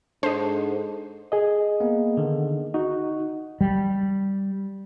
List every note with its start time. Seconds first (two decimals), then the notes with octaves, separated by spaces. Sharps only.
0.23 G#2 D4 A4 C5 D#5 A5
1.32 G#4 D#5
1.80 A#3 B3
2.17 D3 D#3
2.74 D#4 F#4
3.61 G3